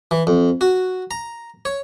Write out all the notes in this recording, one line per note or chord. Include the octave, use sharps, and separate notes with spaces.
E3
F2
F#4
A#5
C#5